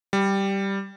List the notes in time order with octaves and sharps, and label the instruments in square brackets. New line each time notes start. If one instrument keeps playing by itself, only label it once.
[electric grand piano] G3